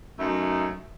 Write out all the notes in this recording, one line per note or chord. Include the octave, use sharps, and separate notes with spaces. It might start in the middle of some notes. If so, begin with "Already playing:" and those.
F#2 A3 D#4